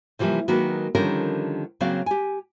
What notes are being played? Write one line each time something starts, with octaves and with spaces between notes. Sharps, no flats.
C3 E3 F3 G3 A#3
D#3 F#3 G#3 A#3 F#4 B4
D3 D#3 F3 G3 C#4 A#4
C#3 F#3 A#3 C4 D5 F5
G4 G#5